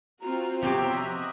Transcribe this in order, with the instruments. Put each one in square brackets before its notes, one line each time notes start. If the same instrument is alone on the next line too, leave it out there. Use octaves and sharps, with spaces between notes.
[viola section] C4 F4 F#4 [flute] A#5
[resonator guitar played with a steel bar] C3 C4 G4 [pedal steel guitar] F3 B3 C#5 [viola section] E5
[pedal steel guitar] F#4 D#5